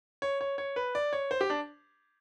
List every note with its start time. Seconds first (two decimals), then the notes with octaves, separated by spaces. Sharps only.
0.22 C#5
0.41 C#5
0.58 C#5
0.76 B4
0.95 D5
1.13 C#5
1.31 C5
1.41 G4
1.50 D4